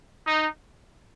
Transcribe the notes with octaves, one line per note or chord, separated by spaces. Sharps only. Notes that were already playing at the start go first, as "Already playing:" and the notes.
D#4